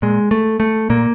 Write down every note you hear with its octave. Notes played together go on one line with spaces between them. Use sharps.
A#2 G#3
A3
A3
A#2 A#3